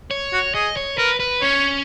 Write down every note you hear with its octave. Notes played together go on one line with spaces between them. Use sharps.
C#5
F#4
G#4 D#5
C#5
A#4 B4
B4
C#4 C#5